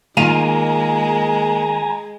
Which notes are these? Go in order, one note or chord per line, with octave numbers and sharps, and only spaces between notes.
D#3 G#3 A#3 F4 F5 G#5 A#5